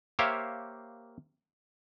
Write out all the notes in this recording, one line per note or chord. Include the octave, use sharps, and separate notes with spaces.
A#3 G4 C5 C#5 E5 F5